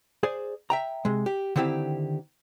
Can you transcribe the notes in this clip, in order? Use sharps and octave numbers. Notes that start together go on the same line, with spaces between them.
G#4 C5 D5
E5 G5 A#5
C3 G#3
G4
D3 D#3 C4 E4 G4